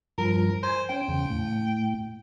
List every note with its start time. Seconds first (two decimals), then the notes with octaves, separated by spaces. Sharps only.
0.18 G2 F3 A#4
0.63 C5 G#5
0.89 C#4 G5
1.08 E2 C#3
1.30 A2